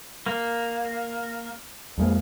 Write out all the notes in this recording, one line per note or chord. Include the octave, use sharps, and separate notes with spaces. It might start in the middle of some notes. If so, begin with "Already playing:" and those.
A#3
F2 G#3 A#3